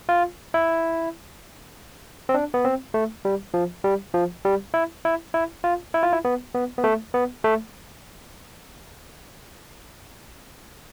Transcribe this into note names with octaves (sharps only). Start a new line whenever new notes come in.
F4
E4
C4
D4
B3
C4
A3
G3
F3
G3
F3
G3
E4
E4
E4
F4
E4
F4
E4
B3
B3
B3
A3
B3
A3